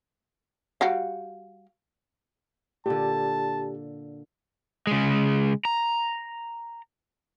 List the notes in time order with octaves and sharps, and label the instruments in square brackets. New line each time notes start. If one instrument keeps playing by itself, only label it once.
[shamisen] G3 F#4 F5
[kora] A#2 D3 [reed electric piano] G4 [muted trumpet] A5
[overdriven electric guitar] C#3 G#3
A#5